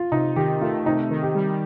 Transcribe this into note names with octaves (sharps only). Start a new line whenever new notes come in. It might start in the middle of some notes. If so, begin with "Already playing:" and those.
Already playing: F4
C3 D#4
D#3 G4
A3 F4
C3 D#4
D#3
G4
G3